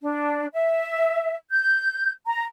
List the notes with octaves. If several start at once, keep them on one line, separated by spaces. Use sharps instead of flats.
D4
E5
G6
A#5